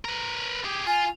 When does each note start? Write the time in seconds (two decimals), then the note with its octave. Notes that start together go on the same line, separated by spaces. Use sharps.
0.05 A#4 B4
0.65 G4 G#4
0.87 F4 G#5